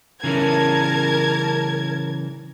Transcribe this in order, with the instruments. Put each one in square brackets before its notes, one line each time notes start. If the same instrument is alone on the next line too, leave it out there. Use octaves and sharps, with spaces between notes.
[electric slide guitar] C#3 E3 C#4 [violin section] A#4 A5 G#6